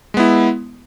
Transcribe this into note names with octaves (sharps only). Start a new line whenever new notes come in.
G#3 B3 E4